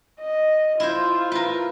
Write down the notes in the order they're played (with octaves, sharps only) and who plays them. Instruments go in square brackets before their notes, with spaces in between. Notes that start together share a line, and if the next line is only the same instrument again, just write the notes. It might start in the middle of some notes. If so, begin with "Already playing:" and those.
[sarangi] D#5
[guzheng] E4 C5 [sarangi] F4
[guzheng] A#4 B4